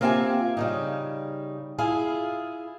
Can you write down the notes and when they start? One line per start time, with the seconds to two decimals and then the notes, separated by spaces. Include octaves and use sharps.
0.01 A#3 C4 F4 G4 E5 G#5
0.57 C#3 G3 D#4
1.78 E4 F4 G#4